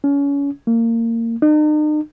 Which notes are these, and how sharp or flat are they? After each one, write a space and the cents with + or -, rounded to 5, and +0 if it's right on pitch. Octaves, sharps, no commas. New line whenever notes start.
C#4 +30
A#3 -25
D#4 -45